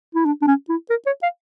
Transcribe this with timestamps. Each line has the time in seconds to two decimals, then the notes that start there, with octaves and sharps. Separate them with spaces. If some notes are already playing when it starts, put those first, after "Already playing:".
0.15 E4
0.26 D4
0.42 D4
0.47 C#4
0.69 E4
0.90 A#4
1.06 C#5
1.23 F5